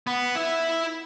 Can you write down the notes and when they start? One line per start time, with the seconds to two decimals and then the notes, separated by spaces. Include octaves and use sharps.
0.07 B3
0.35 E4 E5